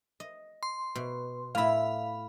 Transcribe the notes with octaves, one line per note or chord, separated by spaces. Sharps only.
D#5
C6
B2
A2 E4 F5 B5